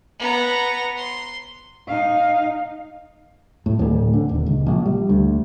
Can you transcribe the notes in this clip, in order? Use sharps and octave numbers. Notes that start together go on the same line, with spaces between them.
B3 A#5
C6
D#4 F5
A2
D1
D3
D#1
C#2
A#1
G3
D2